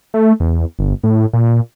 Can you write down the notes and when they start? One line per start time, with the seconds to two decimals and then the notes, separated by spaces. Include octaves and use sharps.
0.14 A3
0.40 E2
0.79 G1
1.04 A2
1.33 A#2